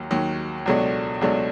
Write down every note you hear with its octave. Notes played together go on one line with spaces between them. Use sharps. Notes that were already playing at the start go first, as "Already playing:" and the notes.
Already playing: D#2 D#3 F#3
D#2 D#3 F#3
C#2 B2 F#3 A3 D4
C#2 B2 F#3 A3 D4